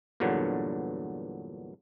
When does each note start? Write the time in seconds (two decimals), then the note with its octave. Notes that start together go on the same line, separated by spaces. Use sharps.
0.20 E2 G2 A#2 D3 F#3